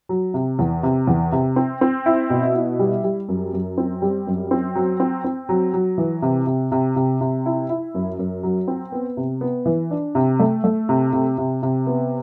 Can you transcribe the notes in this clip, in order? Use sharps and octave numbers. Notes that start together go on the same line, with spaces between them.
F#3
C3
E2
C3
E2
C3
C4
C4
E4
B2
E4
G3
G3
F#2
F#2
C4
G3
F#2
C4
F#3
C4
C4
F#3
F#3
E3
C3
C3
C3
C3
C3
E4
E4
F#2
F#2
F#3
C4
B3
C3
B3
E3
D4
C3
A3
A3
C3
C3
C3
C3
B3